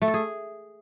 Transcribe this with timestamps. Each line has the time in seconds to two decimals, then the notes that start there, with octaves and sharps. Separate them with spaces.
0.02 A3
0.08 A4
0.14 G#4